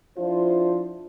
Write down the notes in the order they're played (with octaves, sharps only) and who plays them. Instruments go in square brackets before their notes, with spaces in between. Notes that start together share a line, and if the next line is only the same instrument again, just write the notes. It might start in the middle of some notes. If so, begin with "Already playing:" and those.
[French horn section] F3 D4 E4 F4 C5